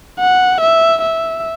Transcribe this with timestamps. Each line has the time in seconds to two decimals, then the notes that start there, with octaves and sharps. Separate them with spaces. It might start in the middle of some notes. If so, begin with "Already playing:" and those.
0.20 F#5
0.61 E5
1.02 E5